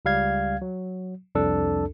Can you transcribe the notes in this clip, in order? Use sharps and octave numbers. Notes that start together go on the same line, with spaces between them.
C#2 G3 F5 G#6
F#3
C2 F2 D4 A4